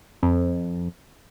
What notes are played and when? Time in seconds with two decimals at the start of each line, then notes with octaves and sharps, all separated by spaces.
0.23 F2